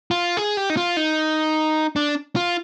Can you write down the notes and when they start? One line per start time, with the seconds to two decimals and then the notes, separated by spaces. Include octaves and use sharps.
0.11 F4
0.37 G#4
0.57 G4
0.70 D#4
0.77 F4
0.97 D#4
1.96 D4
2.36 F4